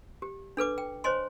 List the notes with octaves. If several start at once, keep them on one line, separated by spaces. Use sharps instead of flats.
G4
D4 A4 B4 D6
G5
C5 C#5 D#5 G#5 C6